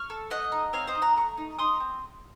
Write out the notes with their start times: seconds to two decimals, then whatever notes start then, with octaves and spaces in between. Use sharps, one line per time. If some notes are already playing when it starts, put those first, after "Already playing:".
Already playing: C#6 F6
0.10 A4
0.30 A3 D#5 F#5
0.52 D#4
0.73 C4 C#5 F5
0.87 C5 D#5
0.95 D#4
1.02 F#5 A#5
1.16 A3 A#5 C#6
1.37 D#4
1.59 D#4 C6 D#6
1.80 C4